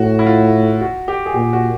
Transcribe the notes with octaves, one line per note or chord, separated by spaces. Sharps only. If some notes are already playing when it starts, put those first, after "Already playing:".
Already playing: A2 F#4
E4
F4
F#4
G4
G#4
A#2 G4
F#4